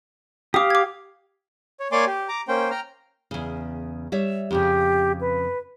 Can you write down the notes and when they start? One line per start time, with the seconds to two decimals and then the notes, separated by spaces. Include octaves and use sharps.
0.54 G4 F5 D6 D#6
0.70 D6 G#6
1.80 C#5
1.92 A#3 C#5 D5 G#5 C6 D6
2.07 G4
2.29 A#5 D6
2.48 A#3 C#4 C5 G5
2.71 G5 A#5 F6
3.31 E2 C#3
4.12 G3 C#5 E5
4.51 F2 A#2 C#3 G4
5.21 B4